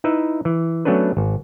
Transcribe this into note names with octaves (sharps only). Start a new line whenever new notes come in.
D#4 E4 B4 E5
E3
F#3 A3 B3 C#4 D4 B4
G#1